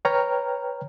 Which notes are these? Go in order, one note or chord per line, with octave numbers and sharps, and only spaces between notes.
B4 C#5 G5 A#5 F6